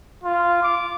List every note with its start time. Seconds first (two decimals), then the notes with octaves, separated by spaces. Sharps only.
0.24 F4
0.62 D6